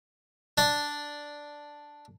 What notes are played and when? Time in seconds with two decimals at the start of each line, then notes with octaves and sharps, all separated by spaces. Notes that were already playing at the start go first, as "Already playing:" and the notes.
0.58 D4 D5